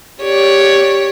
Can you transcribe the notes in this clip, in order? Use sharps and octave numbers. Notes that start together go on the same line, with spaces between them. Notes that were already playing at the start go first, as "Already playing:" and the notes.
G4 C#5 D5